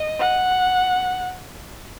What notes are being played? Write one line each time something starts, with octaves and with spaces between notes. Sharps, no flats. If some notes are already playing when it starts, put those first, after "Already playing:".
Already playing: D#5
F#5